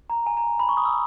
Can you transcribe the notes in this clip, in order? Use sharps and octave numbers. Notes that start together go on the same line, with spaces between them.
A#5
G#5
A#5
B5
C#6
D#6
E6